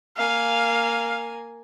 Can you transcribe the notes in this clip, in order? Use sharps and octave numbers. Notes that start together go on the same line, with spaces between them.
A#3 F5 G#5